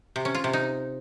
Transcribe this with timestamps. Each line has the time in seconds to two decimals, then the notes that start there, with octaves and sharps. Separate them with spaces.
0.16 C3
0.25 C#4
0.35 F4
0.44 C3
0.53 D#4